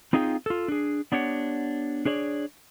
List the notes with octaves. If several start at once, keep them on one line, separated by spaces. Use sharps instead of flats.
C4 D#4 F4 G#4 D#5 G5
F4 A4
D4 G#4
B3 D4 G4 C#5 F#5
D4 G#4 C#5 D5